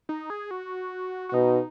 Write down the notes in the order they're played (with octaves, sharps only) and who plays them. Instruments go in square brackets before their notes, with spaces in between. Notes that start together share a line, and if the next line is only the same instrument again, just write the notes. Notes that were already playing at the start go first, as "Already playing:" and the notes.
[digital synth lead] D#4
G#4
F#4
F#4
[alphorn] B2 [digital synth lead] D#4